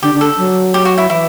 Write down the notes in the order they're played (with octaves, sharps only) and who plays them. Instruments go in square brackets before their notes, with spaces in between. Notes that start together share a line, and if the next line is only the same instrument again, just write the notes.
[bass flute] D3 [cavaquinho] G4
[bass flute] D3
[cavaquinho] A4
[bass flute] F#3
[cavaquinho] G4
F#4
E4
[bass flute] E3 [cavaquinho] E4